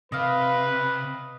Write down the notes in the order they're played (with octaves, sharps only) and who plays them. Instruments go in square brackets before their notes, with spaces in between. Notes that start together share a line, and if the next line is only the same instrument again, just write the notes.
[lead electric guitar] C3 [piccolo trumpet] B4 [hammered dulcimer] D#5 F5